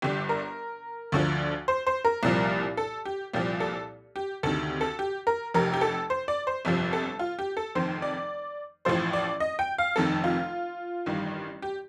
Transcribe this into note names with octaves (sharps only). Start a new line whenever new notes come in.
G1 G2 D3 G4
A#4
D2 D3 F3
C5
C5
A#4
C2 A#2 F3
A4
G4
C2 A#2 F3 G4
A4
G4
D2 C3 D#3 A4
A4
G4
A#4
F1 F2 C3 A#4
G4
A4
C5
D5
C5
G1 F2 C3 F3
A4
F4
G4
A4
F1 F2 D#3 C5
D5
A1 A2 F3 C5
D5
D#5
G5
F5
F1 F2 D#3 A4
F4
A1 G2 D#3
G4